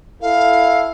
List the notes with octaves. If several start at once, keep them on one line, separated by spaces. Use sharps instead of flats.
E4 A4 F5